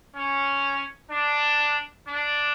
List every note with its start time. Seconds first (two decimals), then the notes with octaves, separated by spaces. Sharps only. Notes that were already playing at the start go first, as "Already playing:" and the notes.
0.15 C#4
1.11 D4
2.07 D4